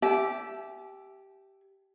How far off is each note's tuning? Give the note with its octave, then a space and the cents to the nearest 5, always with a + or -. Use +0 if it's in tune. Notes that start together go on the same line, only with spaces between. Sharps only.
G4 -10 E5 +5 G#5 +45